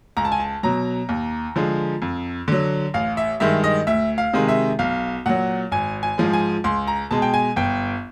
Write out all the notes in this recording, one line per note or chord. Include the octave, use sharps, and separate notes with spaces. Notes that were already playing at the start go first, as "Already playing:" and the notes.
C#2 A#5
A5
G#5
A5
B2 F#3 A#5
D#2
D3 F3 G#3
F2
D3 F#3
A1 F5
E5
G2 D#3 G#3 E5
D#5
D2 E5
F5
C3 D#3 G#3
E5
B1 F5
A#2 F#3 F#5
G#1 G#5
G#5
G#2 F3 G#3
G#5
C#2 C6
A#5
B2 G#3 A5
G5
G#5
G1 G5